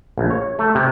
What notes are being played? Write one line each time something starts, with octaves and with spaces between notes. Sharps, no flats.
A#1
C#5
A3
C3